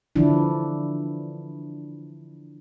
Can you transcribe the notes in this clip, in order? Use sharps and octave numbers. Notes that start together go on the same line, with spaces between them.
D3 E3 F3 D4 E4